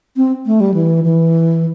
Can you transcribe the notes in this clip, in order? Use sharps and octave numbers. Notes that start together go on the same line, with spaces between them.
C4
A3
G3
E3
E3